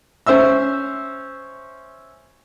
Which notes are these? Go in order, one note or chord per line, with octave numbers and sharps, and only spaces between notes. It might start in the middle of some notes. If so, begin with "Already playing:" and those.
C#4 C5 E5 E6